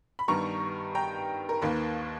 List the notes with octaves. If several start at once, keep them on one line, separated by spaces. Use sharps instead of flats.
B5
G2 D#3 G3 B3 A#5 C#6
G5 A#5
A#4
D#2 D#3 A#3 B4